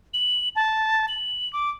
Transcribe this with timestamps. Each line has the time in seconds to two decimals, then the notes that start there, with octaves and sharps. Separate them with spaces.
0.14 F#7
0.56 A5
1.08 F#7
1.53 D6